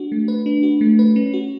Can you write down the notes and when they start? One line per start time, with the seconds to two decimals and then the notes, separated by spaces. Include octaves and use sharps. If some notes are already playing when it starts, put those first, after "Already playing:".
Already playing: D4 F#4
0.12 A3
0.28 B4
0.46 D4
0.63 F#4
0.81 A3
0.99 B4
1.16 C#4
1.34 F#4